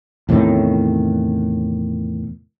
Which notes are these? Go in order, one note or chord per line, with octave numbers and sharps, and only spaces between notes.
E2 A2 C3 D#3